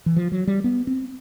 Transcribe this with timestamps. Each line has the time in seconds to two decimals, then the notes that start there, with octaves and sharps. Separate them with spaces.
0.06 E3
0.16 F3
0.32 F#3
0.47 G3
0.64 B3
0.87 C4